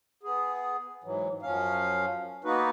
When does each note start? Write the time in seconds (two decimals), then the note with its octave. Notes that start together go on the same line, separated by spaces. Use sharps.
0.23 B3 G#4
1.04 G#2 E3 F#3
1.43 F#2 F3 C#4 F5
2.44 A#3 B3 D#4 F#4 B4